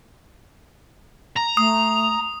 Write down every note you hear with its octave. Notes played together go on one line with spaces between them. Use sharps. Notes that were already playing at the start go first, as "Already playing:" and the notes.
A#5
A3 D#6